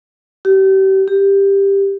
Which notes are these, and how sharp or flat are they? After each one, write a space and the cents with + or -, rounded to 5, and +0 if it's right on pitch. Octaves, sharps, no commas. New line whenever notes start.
G4 -35
G4 +10